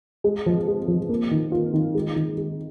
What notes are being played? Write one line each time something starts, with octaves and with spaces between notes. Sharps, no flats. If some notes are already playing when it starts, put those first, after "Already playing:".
G#3
F3
G#3
F3
A#3
D#3
F4
D#3
G#3
D#3
G#3